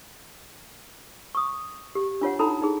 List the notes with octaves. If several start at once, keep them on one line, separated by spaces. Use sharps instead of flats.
C#6 D#6
G4
D4 F4 C#5 F#5
D#4 E4 A4 A#5 B5
D#4 G#4